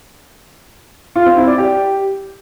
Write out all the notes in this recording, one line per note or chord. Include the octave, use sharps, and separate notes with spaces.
F4
C4
E4
D5
G4